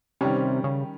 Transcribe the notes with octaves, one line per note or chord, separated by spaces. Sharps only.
C3 D#3 G3 C#4
C#3